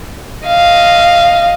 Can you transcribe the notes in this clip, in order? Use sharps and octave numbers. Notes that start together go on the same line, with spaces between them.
D#5 F5